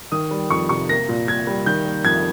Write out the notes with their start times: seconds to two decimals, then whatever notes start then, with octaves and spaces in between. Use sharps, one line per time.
0.12 D#3 D#6
0.31 G3
0.50 F2 C#6
0.69 C3 C#6
0.89 A#3 A#6
1.08 A#2
1.28 A#2 G#6
1.47 G3
1.66 D#3 G6
1.85 A#3
2.05 F2 G#6